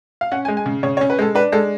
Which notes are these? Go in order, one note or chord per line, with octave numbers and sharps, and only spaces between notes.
F5
C#4 F#5
G#5
G#3
G#5
C#3
C#3 C#5
C#5
C#4
B4
G#3 A4
D4 B4
G#3 A4